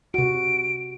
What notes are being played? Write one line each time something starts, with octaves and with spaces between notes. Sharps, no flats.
C3 F#4 D7